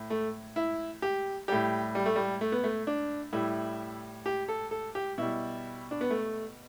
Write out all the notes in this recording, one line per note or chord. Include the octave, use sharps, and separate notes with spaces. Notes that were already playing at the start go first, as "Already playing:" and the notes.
Already playing: A2
A3
E4
G4
A2 G3 G4
G3
A3
G3
A3
B3
A3
D4
A2 G3 E4
G4
A4
A4
G4
B2 G3 E4
D4
B3
A3